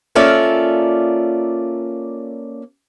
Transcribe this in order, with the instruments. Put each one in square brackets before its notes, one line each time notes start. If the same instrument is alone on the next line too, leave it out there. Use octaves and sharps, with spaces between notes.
[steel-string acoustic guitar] A#3 C#4 F4 A4 D5 E5